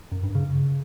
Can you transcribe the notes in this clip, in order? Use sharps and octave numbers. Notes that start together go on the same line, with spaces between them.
F#2
G2
C#3